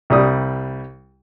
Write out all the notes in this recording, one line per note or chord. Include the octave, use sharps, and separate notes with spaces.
C2 G3 D#6